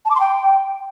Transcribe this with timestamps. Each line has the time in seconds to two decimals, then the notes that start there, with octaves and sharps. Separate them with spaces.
0.05 A5
0.10 D6
0.15 C6
0.20 G5